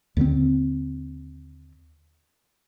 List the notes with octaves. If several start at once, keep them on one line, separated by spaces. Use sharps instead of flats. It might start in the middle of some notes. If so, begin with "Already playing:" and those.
D#2 D3 F3 C4